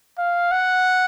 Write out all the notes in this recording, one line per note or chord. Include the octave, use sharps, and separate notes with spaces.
F5
F#5